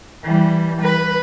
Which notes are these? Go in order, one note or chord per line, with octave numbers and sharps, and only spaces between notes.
E3 G3
B4